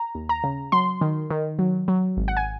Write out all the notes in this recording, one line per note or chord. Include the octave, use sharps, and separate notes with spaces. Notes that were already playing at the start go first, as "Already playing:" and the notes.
Already playing: A#5
D#2
A#5
C#3
F#3 C6
D#3
D#3
F#3
F#3
G#1
F#5
G#5